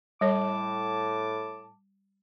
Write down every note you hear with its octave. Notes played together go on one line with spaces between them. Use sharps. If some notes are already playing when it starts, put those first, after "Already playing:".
A2 G3 C#5 A5 D6